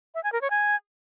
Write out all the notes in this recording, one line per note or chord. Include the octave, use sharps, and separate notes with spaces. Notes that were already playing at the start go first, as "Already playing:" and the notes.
E5
G#5
A#4
C#5
G#5